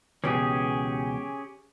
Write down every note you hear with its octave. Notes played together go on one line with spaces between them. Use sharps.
C#2 B2 E3 C#4 G4 G#4